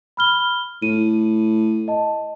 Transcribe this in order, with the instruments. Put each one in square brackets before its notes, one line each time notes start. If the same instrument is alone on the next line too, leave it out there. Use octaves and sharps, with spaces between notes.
[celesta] B5 F6 G7
[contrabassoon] A2 [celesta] D#7
[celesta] D#5 A5